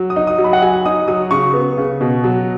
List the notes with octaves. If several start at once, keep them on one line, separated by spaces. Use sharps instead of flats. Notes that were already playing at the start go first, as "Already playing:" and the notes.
Already playing: F#3
D#6
D#4
D#6
F#3
B5
F#5
F#3 G#5
D#4 D#6
F#3 D#6
C#3 C#6
B3
C#3
B2
F#3